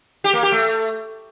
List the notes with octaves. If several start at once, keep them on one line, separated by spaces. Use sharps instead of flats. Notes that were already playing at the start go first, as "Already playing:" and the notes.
G4
A#3
G4
A3